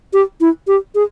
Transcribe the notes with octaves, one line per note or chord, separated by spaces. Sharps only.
G4
E4
G4
G#4